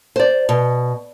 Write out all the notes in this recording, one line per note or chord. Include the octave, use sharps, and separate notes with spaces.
C5 D5
B2